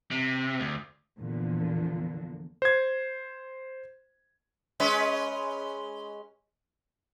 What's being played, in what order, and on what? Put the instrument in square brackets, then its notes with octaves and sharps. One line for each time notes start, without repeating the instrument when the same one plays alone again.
[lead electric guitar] C3
D2
[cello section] E2 A#2 D3 F3
[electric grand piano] C5 G#6
[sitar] G#3 C#4 B4